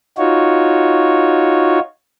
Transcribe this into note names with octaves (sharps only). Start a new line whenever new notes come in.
D#4 F4 F#4 C#5